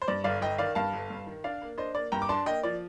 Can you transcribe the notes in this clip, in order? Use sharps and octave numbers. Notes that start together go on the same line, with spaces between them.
C5
G2 D5
G1 D5 F5
G1 D#5 G5
D#3 D5 F5
G2 F5 A5
G1
G2
D#3
D4 D5 F5
A#3
D4 C5 D#5
A#3 D5
G2 G5 A#5
D6
D4 A5 C6
A#3 D#5 G5
F3 D5